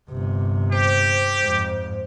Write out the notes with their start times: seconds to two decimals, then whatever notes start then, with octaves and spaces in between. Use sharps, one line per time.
0.10 G1 C3
0.72 G4 C5
1.41 F2 G#2